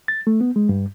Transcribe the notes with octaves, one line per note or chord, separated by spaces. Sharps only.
A6
A3
B3
G#3
G2